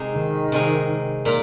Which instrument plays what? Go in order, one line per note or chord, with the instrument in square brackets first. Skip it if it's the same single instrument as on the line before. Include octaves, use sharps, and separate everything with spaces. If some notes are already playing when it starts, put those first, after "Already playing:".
Already playing: [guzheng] C3 G#3 D#4 C5
[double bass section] D#3
[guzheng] C3 G#3 D#4 A#4
A#2 A#3 F4